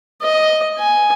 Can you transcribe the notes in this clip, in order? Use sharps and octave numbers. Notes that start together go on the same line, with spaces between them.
D#5
G#5